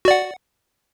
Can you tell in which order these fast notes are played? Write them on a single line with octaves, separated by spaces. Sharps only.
F#4 D5 F#5